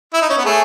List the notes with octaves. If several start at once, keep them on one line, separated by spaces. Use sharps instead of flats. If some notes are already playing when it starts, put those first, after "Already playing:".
E4
D#4
C#4
B3
A3 G#4 C#5 G#5